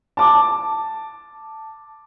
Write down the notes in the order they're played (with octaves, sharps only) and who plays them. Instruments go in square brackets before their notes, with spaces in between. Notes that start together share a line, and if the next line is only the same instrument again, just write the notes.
[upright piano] A5 D6